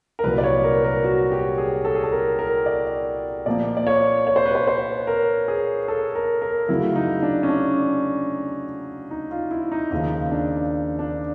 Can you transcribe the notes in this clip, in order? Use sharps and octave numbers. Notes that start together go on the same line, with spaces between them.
A#4
C2 A#2 F#3 B4
D5
C#5
A#4
A#4
F#4
G4
G#4
A4
G#4
A4
A#4
A#4
D5
A#2 F3 A#3 D5
D5
C#5
C#5
C5
B4
C5
C5
A#4
G#4
A4
A#4
A#4
F#2 C#3 F#3 A3 E4
D#4
D4
C#4
D4
D#4
F4
E4
D#4
D#2 C#3 F3 D#4
D4
D4